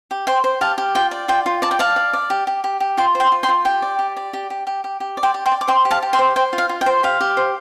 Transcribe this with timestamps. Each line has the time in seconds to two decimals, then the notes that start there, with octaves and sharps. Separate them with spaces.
0.11 G4
0.27 C5 G5 C6
0.44 C5
0.61 G4 F5 A5
0.78 G4
0.95 F4 G5
1.11 D5
1.28 F4 G5
1.46 F4
1.62 D5 A5
1.71 G5
1.79 D5 F5 A5
1.96 D5
2.13 D5
2.30 G4
2.47 G4
2.64 G4
2.80 G4
2.97 F4 G5 C6
3.15 C5
3.20 G5 C6
3.32 F4
3.43 G5 C6
3.49 F4
3.65 G4 G5
3.82 D5
3.99 G4
4.17 D5
4.33 G4
4.50 G4
4.67 G4
4.84 G4
5.00 G4
5.17 D5
5.23 G5 C6
5.34 G4
5.46 G5 C6
5.52 D5
5.61 D6
5.68 C5 G5 C6
5.85 G4
5.91 F5 A5
6.03 G4
6.13 G5 C6
6.19 C5
6.36 C5 G5
6.53 F4
6.58 F5
6.69 F4
6.81 G5
6.86 C5
7.03 G4 F5
7.21 G4
7.37 C5